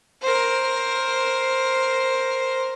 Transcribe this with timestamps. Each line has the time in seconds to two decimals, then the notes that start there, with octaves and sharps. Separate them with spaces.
0.22 A#4 C5